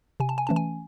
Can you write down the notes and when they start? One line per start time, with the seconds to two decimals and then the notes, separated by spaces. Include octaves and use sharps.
0.20 C3 G#5
0.29 A5
0.38 G#5
0.47 E3 A3 C#4 A5
0.56 G#5